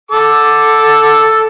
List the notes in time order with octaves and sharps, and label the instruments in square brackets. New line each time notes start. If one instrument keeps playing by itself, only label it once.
[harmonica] A4 D6